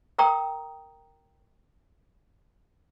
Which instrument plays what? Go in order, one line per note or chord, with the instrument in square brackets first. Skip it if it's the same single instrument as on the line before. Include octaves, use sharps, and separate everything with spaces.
[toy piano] A#4 G5 A#5 D#6